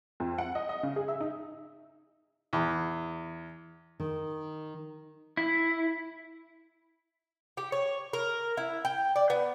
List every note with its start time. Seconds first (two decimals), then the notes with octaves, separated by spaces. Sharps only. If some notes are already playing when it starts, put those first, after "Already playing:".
0.20 F2
0.38 F#5
0.55 D#5
0.69 D#5
0.83 C#3
0.96 G#4
1.08 E5
1.20 D#4
2.53 E2
4.00 D#3
5.37 E4
7.57 G4
7.72 C#5
8.13 A#4
8.57 E4
8.85 G5
9.16 D5
9.30 B3